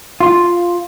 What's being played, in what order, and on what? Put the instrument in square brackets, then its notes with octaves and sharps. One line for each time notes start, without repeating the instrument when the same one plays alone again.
[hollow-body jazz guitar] F4